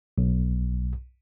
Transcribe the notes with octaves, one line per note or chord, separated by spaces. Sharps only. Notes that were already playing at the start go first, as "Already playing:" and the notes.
B1